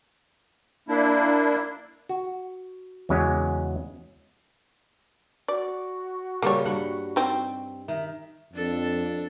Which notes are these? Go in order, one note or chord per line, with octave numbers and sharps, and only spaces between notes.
A#3 D4 E4
F#4
E2 C#3 F#3 G#3 C#4
F#4 D5
C#3 G3 A#3 C#5
G2 G3 F#5
C4 D#4
D#3 E5
F2 D4 A4